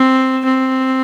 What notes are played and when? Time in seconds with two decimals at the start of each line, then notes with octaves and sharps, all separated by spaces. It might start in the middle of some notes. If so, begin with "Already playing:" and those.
Already playing: C4
0.44 C4